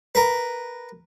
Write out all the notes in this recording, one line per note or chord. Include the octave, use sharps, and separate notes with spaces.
A#4 B4